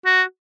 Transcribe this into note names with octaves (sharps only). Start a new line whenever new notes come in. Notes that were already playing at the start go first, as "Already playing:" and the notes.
F#4